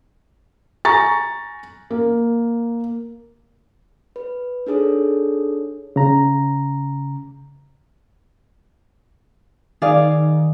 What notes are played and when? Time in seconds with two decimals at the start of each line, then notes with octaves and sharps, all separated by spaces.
0.85 G#5 A#5 C#6 A6
1.90 A#3
4.16 B4
4.67 D4 D#4 G#4 A4 C#5
5.96 C#3 A#5
9.82 D#3 G#4 D5 F5